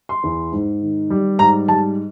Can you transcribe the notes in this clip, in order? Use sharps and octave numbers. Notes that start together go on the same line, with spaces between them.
C6
E2
G#2
D#3
G3
G#2 A#5
G3 A5